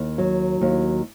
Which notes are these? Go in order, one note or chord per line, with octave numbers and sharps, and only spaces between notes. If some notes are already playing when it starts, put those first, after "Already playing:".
Already playing: D#2
F#3
D#2